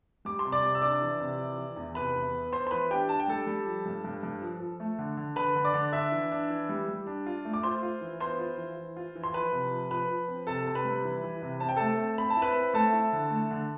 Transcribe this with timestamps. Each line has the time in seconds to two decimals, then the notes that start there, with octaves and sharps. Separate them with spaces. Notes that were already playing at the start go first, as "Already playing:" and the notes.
0.25 G3 D6
0.39 C6
0.45 C3
0.52 D5 D6
0.63 C3
0.75 E6
0.82 D4 D5 D6
1.02 E3
1.20 C3
1.39 E3
1.58 E3
1.76 E2
1.95 C3 B4 B5
2.15 E2
2.33 B3
2.53 B3 C5 C6
2.67 C6
2.71 E3 B4 B5
2.91 D4 G4 G5
3.09 D4 A5
3.20 G5
3.28 G3 A4 A5
3.47 G3
3.66 F3
3.86 G2
4.04 G2
4.23 G2
4.42 F3
4.60 F3
4.80 A3
4.99 D3
5.17 D3
5.36 D3 B4 B5
5.55 D3
5.65 D5 D6
5.74 D3
5.93 D4 E5 E6
6.12 E3
6.32 D4
6.50 E3
6.69 G3
6.88 G3
7.07 D4
7.26 F4
7.45 A3
7.53 D6
7.63 F4 C5 C6
7.83 F4
8.01 E3
8.20 B3 C5 C6
8.39 F4
8.58 E3
8.77 E3
8.97 F4
9.15 E3
9.24 C6
9.34 F3 B4 B5
9.52 C3
9.71 F3
9.91 F3 B4 B5
10.09 F3
10.28 C4
10.47 C3 A4 A5
10.66 C3
10.75 B4 B5
10.85 G3
11.05 E3
11.23 E3
11.42 C3
11.60 C4 A5
11.69 G5
11.76 A3 A4 A5
11.99 C4
12.18 C4 B5
12.30 A5
12.36 E4
12.42 B4 B5
12.56 C4
12.74 A3 A4 A5
12.93 E4
13.13 D3
13.31 A3
13.51 D3